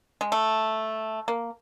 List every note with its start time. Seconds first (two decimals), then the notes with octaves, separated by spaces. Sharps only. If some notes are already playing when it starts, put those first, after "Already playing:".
0.21 G#3
0.32 A3
1.28 A#3